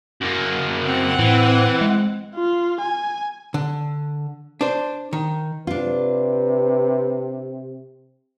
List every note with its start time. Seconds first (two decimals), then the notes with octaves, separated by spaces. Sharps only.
0.21 F#2 A#3
0.87 C4 F#5
1.19 A2 E3
1.81 G#3
2.35 F4
2.81 G#5
3.54 D3
4.61 D4 C5
5.13 D#3
5.67 C3 D4 F4 B4